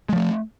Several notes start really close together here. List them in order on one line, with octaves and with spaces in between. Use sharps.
G#3 F3 A3